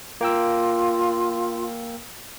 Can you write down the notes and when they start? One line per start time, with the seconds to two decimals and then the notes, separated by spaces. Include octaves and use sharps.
0.21 A#3 F4 G5 E6